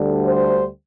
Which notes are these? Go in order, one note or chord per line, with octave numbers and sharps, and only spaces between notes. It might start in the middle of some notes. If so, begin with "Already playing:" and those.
Already playing: D2 D3 G3
C5